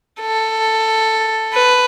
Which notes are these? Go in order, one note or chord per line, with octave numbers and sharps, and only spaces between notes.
A4
B4